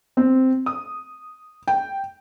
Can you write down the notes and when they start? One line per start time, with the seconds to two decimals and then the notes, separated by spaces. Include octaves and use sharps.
0.17 C4
0.66 D#6
1.68 G5